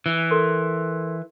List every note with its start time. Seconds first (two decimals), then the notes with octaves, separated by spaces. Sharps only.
0.06 E3
0.31 A4 A#4 C6